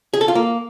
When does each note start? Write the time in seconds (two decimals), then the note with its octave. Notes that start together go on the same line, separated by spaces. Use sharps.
0.14 G#4
0.21 A4
0.28 F4
0.35 A#3